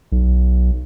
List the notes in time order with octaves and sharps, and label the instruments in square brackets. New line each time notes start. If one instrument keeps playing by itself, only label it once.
[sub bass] B1